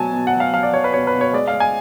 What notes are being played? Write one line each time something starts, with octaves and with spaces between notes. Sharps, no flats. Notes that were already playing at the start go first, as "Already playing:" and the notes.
Already playing: B2 F#3 G#5 A5
B2
F#5
F#3
F5
F#3 F5
D5
F#3 C#5
B4
B2 C#5
B4
B2
C#5
G#3 D5
F5
G#3
G#5